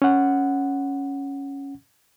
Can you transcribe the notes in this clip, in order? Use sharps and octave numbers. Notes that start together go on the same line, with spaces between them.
C#4 F#5